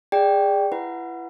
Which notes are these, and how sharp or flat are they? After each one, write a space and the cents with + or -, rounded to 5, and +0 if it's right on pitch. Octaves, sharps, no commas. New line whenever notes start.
G#4 -25 D5 +10 G5 +0
E4 +30 B4 -5 F#5 -5